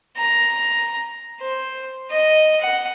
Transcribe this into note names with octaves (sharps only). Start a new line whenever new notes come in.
A#5
C5
D#5
F#5